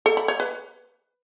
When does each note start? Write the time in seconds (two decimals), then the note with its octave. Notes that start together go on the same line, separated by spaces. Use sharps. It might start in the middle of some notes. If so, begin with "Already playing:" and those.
0.06 A4
0.17 B5
0.28 C#5
0.40 B4